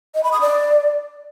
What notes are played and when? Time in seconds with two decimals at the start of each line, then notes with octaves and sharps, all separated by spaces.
0.14 D#5
0.23 B5
0.32 D#6
0.41 D5